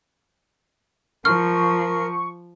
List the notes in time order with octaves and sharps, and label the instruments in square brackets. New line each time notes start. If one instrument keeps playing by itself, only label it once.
[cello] F3 [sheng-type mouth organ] A#4 [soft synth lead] C#6 [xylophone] F6